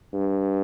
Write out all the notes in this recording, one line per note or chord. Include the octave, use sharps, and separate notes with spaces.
G2